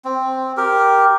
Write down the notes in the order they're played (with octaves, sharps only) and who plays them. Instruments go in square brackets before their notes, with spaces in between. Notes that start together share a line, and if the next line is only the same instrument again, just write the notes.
[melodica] C4
G4 A#4